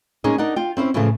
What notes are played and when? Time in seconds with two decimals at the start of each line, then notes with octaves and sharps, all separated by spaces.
0.24 G#3 A#3 C#4 D#4 G#4 D#5
0.38 D4 D#4 A#4 F#5
0.56 F4 G5
0.77 C4 C#4 E4 C5
0.94 A2 C#3 E3 F3 A3